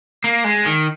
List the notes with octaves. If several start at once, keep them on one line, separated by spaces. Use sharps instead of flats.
A#3
G#3
D#3